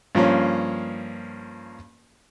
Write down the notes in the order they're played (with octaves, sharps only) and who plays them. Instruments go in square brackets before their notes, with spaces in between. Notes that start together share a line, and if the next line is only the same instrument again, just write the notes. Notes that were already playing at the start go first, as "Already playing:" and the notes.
[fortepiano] G2 F3 A#3 C#4